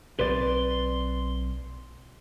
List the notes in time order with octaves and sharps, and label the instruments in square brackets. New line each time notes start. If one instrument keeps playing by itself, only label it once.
[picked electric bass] B1 E3 C4 [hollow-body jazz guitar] B4 D5 [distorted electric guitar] C6